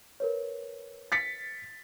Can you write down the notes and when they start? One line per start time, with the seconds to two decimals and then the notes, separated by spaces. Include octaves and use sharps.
0.20 A#4 B4 C#5
1.12 A6 B6 C#7